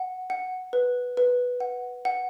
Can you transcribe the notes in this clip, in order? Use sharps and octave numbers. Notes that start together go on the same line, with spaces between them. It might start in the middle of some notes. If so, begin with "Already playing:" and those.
Already playing: F#5
F#5
B4
B4
F#5
F#5